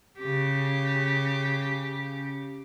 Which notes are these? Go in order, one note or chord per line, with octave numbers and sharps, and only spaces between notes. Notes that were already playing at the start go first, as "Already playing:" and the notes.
C#3 G4